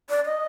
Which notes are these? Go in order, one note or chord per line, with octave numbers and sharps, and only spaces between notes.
D5
D#5